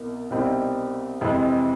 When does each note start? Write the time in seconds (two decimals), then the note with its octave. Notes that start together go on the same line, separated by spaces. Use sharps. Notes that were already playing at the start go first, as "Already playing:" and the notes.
Already playing: C2 B2 A#3
0.30 C2 B2 G3 C4 D#4
1.21 F2 C3 E3 G#3